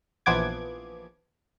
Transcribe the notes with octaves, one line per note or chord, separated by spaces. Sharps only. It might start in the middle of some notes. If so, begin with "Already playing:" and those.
A#1 E3 F3 B3 D6 G#6